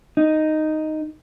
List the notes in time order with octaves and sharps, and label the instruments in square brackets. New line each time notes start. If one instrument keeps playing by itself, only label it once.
[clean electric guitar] D#4